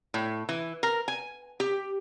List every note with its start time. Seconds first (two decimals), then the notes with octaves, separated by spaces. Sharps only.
0.14 A2
0.49 E3
0.83 A#4
1.08 G#5
1.60 G4